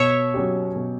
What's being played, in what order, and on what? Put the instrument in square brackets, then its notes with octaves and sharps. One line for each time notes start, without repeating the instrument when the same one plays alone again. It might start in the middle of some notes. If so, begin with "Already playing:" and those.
Already playing: [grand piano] B2 [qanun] C#5 E5
[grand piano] F#3 C#4 G4
B2